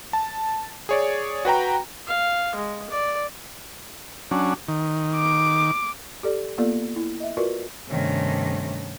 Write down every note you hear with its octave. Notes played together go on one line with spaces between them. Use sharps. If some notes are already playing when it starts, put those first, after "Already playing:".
A5
G#4 C#5 D5
F#4 B4 G5 A#5
F5
G#3
D5
F#3 C#4 D4
D#3
D6
G4 A4 D5
A#3 B3 F4 A4 D5
E4
D#5 E5
F4 F#4 A#4 B4 D5
G2 C3 D#3 A3 C#4 D4